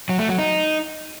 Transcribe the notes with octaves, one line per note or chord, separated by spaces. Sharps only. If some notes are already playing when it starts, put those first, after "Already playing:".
F#3
A3
F#3
D#4